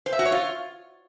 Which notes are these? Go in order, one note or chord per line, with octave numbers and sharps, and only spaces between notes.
C5
E5
F#4
C#5
F4